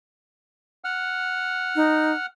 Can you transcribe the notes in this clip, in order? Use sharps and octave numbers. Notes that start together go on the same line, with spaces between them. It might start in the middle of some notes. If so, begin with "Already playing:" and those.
F#5 F6
D#4